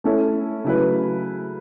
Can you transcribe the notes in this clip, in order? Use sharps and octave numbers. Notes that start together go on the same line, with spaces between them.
A3 C#4 E4 A4
C#3 F#3 A3 E4 B4